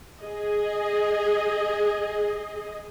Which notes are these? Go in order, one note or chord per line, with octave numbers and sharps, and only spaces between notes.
G#4 D#5